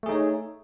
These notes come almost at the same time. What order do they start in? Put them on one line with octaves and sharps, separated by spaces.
A3 G#4 D#4 C#5